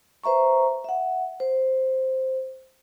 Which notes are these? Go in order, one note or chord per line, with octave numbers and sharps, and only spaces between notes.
B4 C5 E5 A#5 C#6
E5 F#5
C5